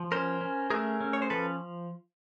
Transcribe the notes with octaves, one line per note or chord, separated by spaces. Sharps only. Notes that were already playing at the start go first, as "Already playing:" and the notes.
Already playing: F3
C#4 A#4 C5
C#4
A3 G#4 A#4
C#4
C#5
C5
F3 A4 B4